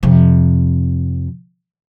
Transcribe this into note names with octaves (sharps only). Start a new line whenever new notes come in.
F2 C3